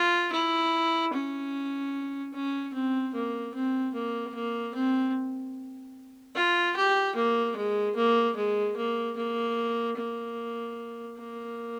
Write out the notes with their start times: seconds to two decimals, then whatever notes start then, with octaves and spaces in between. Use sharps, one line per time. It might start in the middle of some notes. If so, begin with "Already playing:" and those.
Already playing: F4
0.32 E4
1.13 C#4
2.34 C#4
2.74 C4
3.14 A#3
3.54 C4
3.94 A#3
4.35 A#3
4.75 C4
6.35 F4
6.76 G4
7.16 A#3
7.56 G#3
7.96 A#3
8.36 G#3
8.76 A#3
9.17 A#3
9.97 A#3
11.18 A#3